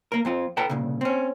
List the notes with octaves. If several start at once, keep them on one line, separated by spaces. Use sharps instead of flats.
A#3 A#4
F2 C4 F4
A4 B4 G5 A5 A#5
C2 A#2 C#3
C4 C#4